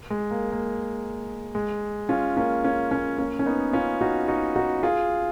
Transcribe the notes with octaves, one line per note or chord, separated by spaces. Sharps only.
G#3
A#3
A#3
G#3
C#4 F4
A#3 C#4
A#3 C#4
A#3 C#4
A#3 C#4
C#4
B3 D#4
C#4 F4
D#4 F#4
D#4 F#4
D#4 F#4
F4 G#4